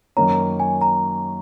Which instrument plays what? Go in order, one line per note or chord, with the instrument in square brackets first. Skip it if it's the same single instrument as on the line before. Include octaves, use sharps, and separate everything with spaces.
[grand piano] F#2 D#3 A#3 C#4 [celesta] A#5
[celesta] G#5
A#5